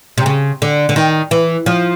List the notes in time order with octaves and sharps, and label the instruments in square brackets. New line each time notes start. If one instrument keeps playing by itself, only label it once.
[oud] C3
C#3
D3
D3
D#3
E3
F3